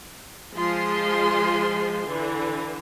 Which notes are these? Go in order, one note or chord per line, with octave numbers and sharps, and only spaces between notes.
F3 G#3 F4 G#4 C6
D3 E3